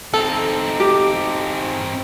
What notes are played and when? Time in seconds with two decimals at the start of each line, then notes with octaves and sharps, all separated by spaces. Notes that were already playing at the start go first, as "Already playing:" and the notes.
0.14 C4 D#4 A4
0.80 G4